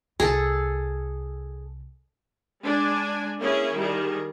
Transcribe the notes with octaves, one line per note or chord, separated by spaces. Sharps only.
C2 G#4 A4
G#3 D4 G#5
A#3 C#4 E4 G#4
D#3 G3 G#4